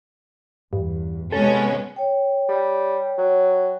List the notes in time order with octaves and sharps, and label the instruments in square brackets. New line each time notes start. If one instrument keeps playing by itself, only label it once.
[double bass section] E2 [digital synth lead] G2
[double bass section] C3 [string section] G#3 B3 C#4 [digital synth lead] A4
[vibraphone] C#5 G5
[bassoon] G3
F#3